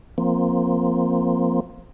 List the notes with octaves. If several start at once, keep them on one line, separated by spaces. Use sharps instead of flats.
F3 A#3 C4